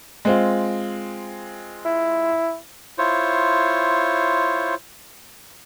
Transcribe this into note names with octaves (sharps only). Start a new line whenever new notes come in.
G#3 C4 F4
E4
E4 F4 C5 C#5